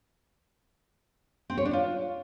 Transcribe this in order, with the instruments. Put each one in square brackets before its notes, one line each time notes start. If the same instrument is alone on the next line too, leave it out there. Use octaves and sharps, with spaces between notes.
[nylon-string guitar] C4
C#5
D4
F4